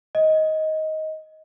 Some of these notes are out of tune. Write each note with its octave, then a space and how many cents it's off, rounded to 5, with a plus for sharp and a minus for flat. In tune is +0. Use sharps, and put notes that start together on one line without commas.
D#5 +15